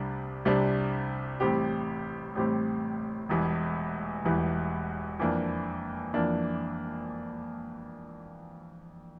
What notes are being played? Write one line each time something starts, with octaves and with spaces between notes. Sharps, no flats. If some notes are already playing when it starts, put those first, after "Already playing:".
Already playing: C2 C3 G3 D4
C2 C3 G3 D4
A1 A2 G3 C4 G4
A1 A2 G3 C4 G4
E1 E2 E3 G3
E1 E2 E3 G3
F2 E3 A#3 D4
F2 E3 A#3 D4